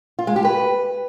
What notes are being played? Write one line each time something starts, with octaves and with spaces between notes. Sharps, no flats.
F4
G#3
G4
B4